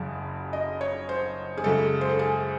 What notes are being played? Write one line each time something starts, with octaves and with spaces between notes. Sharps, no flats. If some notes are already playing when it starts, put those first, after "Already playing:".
Already playing: F#1 F#2 C#3 F#3 A5
D#5
C#5
C5
G#4
F#2 C#3 G#3 A4
C5
A4
G#4